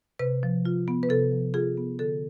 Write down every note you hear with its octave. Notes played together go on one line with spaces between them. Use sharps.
C3 B4
F3
F4
B3
B4
C3 A4
F3
F4 G#4
B3
D3 A4